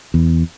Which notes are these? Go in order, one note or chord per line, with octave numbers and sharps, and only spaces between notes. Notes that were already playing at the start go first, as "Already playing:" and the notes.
E2